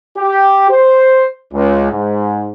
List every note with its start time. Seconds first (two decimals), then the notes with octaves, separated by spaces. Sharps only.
0.17 G4
0.70 C5
1.52 C#2
1.91 G#2